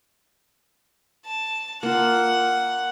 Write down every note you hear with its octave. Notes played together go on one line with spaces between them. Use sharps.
A5
A#3 F4 F#5